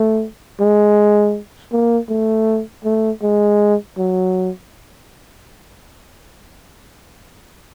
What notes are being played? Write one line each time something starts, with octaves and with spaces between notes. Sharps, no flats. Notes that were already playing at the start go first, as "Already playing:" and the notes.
Already playing: A3
G#3
A#3
A3
A3
G#3
F#3